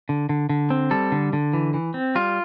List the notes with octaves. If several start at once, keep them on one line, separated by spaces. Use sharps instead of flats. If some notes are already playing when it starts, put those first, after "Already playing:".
D3
D3
D3
C4
G3 A4
D3
D3
E3
E3
C4
G3 F4